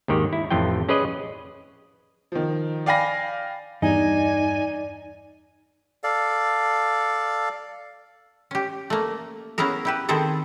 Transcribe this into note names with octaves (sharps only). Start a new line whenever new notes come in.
D#2 G#2 D#3 G4
E4
A1 F2 E3 F4 G5
C#4 G#4 B4 D5 D#5
D#3 F3
D5 F5 G5 G#5 B5 A#6
E2 G2 D#4 D5 G#5
A4 D5 F5
C#4 G4
A3 A#3
B3 C#4 E4 G#4 A#4
E4 G4 B4
D#3 C4 E4 G#4 A4